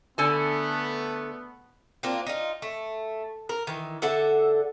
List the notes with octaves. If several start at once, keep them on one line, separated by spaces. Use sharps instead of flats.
D3 A3 B3 A4 G#5
A#3 C4 D4 F4
D#4 F4
A3
A#4
D#3 E3
D3 A4 E5 F#5